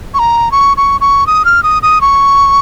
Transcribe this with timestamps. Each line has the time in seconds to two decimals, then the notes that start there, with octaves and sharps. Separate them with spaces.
0.14 C#6
0.19 A#5
0.52 C#6
0.77 C#6
1.01 C#6
1.27 D#6
1.45 F6
1.63 D#6
1.83 D#6
2.01 C#6